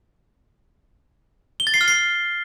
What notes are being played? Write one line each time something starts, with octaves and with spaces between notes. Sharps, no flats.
G7
A6
C7
F6
C7